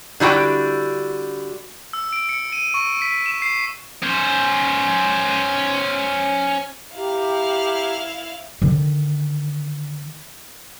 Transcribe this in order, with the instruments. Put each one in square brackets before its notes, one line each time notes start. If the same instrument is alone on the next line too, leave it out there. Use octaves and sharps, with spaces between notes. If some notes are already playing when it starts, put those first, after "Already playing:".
[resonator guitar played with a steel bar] D3 G3 E4 F#4 G5
[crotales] E6
D7
C#7
D#7
C#6
B6
E7
C7
[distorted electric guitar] C#4 C5
[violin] E4 F5 [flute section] G4 A#5
[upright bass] D3 D#3